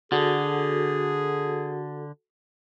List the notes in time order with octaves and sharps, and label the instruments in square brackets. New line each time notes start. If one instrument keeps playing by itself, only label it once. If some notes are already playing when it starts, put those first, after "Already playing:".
[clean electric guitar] D3 [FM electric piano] F#4 A4 [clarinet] G#4